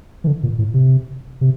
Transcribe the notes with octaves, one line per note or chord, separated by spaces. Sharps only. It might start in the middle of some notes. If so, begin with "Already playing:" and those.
E3
D3
A#2
A2
C3
C3